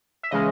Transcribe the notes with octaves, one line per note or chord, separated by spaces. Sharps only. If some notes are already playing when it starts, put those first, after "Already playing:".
E5
C#3 E3 G#3 C#4 D#5